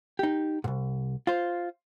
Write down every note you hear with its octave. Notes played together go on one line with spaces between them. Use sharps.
D#4 G4
C2 G#2
F4 C5